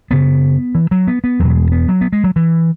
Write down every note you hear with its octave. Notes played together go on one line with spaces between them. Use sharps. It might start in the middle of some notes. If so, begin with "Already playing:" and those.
F#2 C#3 B3
E3
F#3
B3
B3
E2 B2 F#3
B3
G#3
B3
F#3
B3
G#3
F#3
E3